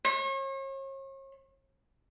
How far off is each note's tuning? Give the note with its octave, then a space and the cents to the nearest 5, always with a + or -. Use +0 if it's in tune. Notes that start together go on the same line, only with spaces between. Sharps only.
C#5 -40